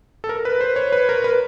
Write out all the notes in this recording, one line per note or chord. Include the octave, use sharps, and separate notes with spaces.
A4
A#4
B4
C5
C#5
B4
A#4
B4